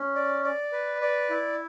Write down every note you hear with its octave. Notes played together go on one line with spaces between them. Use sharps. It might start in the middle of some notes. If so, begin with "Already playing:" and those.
Already playing: C#4
D5
D5
B4
D5
E4